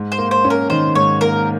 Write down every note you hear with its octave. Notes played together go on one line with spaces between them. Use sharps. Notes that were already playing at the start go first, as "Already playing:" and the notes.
Already playing: G#2
C5
A#3
C5
C#4
A#4
D#3 C5
G#2 C#5
A#3 A#4